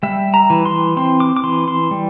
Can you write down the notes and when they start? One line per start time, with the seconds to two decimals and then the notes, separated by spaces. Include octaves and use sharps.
0.03 G3 E5
0.34 A#5
0.50 E3
0.66 C6
0.97 C4 C6
1.20 D6
1.37 D6
1.43 E3 C6
1.68 C6
1.91 G3